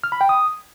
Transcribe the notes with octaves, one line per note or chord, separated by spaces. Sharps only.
F6
B5
G5
D#6